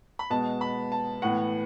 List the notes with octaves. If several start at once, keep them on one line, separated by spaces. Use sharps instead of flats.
B5
B2 G#3 B3 A5
B5
A5
A2 E3 B3 F#5